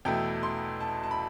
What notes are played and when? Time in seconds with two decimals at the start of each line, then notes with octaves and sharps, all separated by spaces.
0.05 E2 B2 A3 E4 G5
0.43 C6
0.80 A5
1.03 A5
1.11 B5